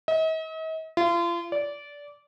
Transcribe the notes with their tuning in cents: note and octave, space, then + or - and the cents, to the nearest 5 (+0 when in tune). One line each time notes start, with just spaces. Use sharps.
D#5 +45
F4 -35
D5 -20